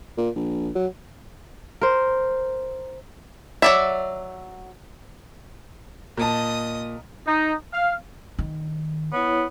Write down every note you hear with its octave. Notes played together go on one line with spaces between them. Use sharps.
A#2
A#1
F#3
A#4 C5
F#3 D5 E5
A#2 D#5 A5 D#6
D#4
F5
D#3
B3 E4 C#5